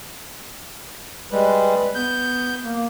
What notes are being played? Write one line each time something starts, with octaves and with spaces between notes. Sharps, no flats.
G3 G#3 B4
B3 G6
A#3